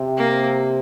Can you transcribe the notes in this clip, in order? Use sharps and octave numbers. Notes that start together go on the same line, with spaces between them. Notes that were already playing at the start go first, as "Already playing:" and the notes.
Already playing: C3
A#3